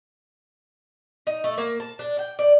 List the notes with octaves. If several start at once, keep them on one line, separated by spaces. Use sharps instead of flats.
D#4
A3
A#3
A5
D4
G5
D5